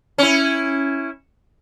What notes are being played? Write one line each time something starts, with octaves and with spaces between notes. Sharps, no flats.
C#4 E4